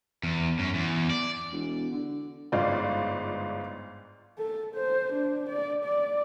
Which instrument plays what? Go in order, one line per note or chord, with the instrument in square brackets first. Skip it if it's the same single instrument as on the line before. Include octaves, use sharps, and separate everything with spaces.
[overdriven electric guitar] E2
F#2
E2
D5
[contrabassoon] E1
D3
[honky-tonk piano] G1 G#2 F4 D5
[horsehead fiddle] A4
C5
D4
D5
D5